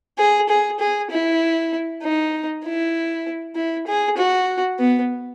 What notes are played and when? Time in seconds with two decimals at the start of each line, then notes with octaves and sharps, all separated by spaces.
0.18 G#4
0.49 G#4
0.80 G#4
1.10 E4
2.02 D#4
2.64 E4
3.56 E4
3.87 G#4
4.17 F#4
4.79 B3